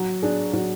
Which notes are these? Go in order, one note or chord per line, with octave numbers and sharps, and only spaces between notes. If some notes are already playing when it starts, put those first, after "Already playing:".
Already playing: F#3
D4 G#4
F#3